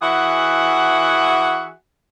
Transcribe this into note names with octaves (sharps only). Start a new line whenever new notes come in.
E3 F#4 G#4 E5 F#5